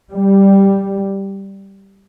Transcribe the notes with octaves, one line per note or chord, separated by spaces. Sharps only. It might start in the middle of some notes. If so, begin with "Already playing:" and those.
G3